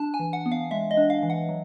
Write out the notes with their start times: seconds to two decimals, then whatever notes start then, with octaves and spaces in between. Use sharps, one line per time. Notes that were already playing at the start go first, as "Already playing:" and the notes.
Already playing: D4 A5
0.14 G#5
0.20 E3
0.33 F#5
0.46 B3
0.52 F5
0.71 G#3 E5
0.91 D#5
0.97 D4
1.10 F5
1.23 E3
1.30 F#5
1.49 F#3